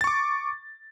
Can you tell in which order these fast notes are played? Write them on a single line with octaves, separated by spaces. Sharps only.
A6 C#6 D6